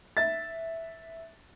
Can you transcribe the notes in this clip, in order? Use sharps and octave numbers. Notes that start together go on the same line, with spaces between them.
E5 A6